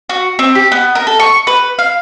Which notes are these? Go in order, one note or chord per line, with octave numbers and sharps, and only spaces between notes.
F#4
C4
G4
B3
A#4
A4
C#6
B4
F5